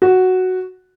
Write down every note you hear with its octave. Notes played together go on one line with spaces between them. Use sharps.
F#4